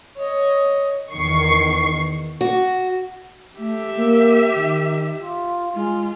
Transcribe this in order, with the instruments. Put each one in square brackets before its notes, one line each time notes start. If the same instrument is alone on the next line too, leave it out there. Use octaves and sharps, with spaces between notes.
[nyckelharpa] C#5 D#5
[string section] E2 D#3 C#6 C7
[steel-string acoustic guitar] F#4
[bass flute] A3 [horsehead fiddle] G4 E5
[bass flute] A#3
D#3
F4
[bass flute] G#3 [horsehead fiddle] F4